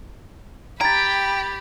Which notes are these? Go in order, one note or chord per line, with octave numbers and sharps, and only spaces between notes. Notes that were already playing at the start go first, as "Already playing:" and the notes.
G4 G5 A#5 B5 G#6 A6